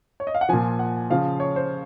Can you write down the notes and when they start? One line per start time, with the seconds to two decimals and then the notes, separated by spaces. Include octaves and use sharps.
0.20 C#5
0.27 D#5
0.35 F5
0.41 F#5
0.49 A#2 F3 G#5
0.79 F#5
1.10 C#3 F3 F5
1.40 C#5
1.56 C5